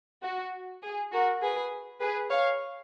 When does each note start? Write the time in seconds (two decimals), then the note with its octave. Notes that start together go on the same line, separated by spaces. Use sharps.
0.23 F#4
0.83 G#4
1.13 F#4 A#4
1.42 G#4 B4
2.01 G#4 B4
2.31 C#5 F5